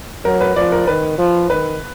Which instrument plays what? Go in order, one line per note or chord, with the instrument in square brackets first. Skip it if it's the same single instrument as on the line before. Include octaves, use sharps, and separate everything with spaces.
[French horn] F#3 [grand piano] A#4
[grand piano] B4
[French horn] F3 [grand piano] D5
[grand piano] A#4
[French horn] D#3 [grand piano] B4
[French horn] F3
[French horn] D#3 [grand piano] B4